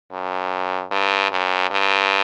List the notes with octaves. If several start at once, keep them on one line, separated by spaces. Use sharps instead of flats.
F#2
G2
F#2
G2